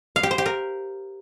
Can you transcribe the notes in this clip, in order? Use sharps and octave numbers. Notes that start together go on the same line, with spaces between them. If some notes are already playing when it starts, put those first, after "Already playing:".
F5
G4
C5
G4
A#4